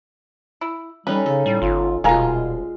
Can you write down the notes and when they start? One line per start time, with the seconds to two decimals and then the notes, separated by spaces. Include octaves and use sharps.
0.61 E4
1.07 G3 C#4 D#4 A4 B4
1.26 C#3 A4
1.46 A2 G3
1.62 G1 F4
2.04 D#1 B2 G#3 F4 A#4 F5 G#5